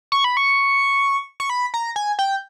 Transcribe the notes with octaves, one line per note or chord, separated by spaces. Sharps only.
C#6
B5
C#6
C#6
B5
A#5
G#5
G5